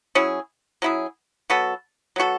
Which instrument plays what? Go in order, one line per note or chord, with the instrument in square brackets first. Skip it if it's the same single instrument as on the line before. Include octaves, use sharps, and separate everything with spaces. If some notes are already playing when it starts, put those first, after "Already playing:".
[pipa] F#3 C#4 E4 G#4
F#3 C#4 E4 G#4
F#3 B3 F#4 A4
F#3 B3 F#4 A4